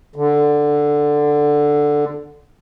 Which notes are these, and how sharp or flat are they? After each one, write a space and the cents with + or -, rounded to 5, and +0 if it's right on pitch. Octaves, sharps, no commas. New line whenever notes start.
D3 +5